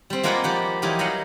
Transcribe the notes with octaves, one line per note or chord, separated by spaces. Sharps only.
G3 C4
G#3 A#3 F4 B4 D5 F#5
F3 G4 F#5
E3 F#3 D#4 F4 G4
F#3 G3 D#5 F5 F#5